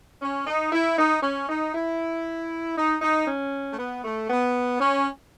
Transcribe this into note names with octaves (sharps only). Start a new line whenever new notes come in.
C#4
D#4
E4
D#4
C#4
D#4
E4
D#4
D#4
C#4
A3
B3
A3
B3
C#4